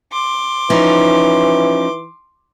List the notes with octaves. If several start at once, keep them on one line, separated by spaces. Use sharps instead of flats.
C6 D6
E3 F3 C#4 D#4